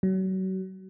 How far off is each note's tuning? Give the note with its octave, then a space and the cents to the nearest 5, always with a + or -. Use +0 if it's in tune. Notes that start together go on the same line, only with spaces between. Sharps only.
F#3 +35